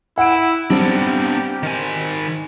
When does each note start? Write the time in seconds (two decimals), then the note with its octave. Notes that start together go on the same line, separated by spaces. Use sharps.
0.18 E4 F#5 D7
0.70 G3 B3 C4 D4 G4
1.63 D#3 G#5